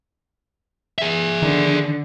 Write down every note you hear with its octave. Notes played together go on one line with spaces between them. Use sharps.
G#4 E5
D3 D#3